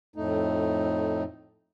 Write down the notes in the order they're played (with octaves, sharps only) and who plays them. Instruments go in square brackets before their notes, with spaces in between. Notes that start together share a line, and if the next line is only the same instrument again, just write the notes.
[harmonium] F2 A2 A3 D#4